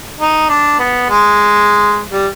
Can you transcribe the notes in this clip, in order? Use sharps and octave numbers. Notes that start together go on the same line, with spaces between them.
D#4
D4
B3
G#3
G3